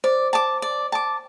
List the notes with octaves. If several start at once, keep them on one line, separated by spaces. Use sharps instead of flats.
C5 D5
A5 D6
D5
A5 D6